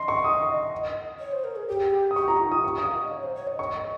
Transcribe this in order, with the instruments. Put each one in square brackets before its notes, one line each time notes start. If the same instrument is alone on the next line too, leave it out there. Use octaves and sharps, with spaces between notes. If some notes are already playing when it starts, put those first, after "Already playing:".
Already playing: [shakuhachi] D#5 [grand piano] C6
[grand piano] C#6
D#6
[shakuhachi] C#5
C5
A#4
G#4
G4
[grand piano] D#6
[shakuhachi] G4 [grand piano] C#6
[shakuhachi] F4 [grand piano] A#5
[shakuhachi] D#4
[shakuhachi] F4 [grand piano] D#6
[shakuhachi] G4 [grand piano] C#6
[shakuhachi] F5 [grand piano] D#6
[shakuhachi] D#5
C#5
C5
C#5
D#5
[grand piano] C#6